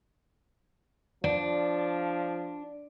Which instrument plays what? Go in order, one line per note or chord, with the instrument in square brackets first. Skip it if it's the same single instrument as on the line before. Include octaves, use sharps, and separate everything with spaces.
[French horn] F3 [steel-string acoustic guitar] D4